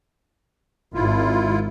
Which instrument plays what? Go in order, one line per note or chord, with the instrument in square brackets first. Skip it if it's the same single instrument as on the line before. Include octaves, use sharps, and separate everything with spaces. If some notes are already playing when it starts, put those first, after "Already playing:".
[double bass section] G#1 [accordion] E4 F4